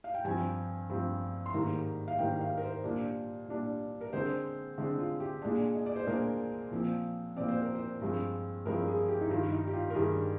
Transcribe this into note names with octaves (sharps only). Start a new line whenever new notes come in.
F5
G5
G2 F3 C4 G#5
G2 F3 C4
C6
G#2 D#3 G3 A#3 A#5
F5
G#2 D#3 G3 A#3 G5
F5
A#4
C5
A#2 G3 D4
A#2 G3 D4
A#4
D3 G#3 C4 C5
D3 G#3 C4
F4
G4
A#2 G#3 D4 G#4
D#5
D5
C5
A#2 G#3 D4 A#4
A#2 F3 C4
A#2 F3 C4 D5
C5
A#4
C5
G2 F3 G#3 C4
G2 F3 G#3 C4 A#4
G#4
G4
D#4
G2 D#3 G3 F4
D#4
G4
F4
A#4
G2 D#3 G3 G#4